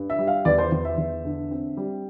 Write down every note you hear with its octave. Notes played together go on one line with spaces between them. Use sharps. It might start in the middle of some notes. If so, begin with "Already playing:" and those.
Already playing: G2
E5
G3
F5
E2 D5
C5
E2
E5
E2
D3
C4
G3